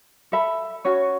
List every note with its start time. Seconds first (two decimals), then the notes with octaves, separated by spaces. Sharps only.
0.32 A4 E5 B5
0.85 C#4 F#4 C#5